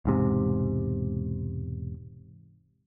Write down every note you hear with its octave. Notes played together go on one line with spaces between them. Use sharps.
E1 G#2 C3